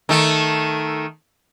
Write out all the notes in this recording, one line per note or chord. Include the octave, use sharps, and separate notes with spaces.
D#3 A3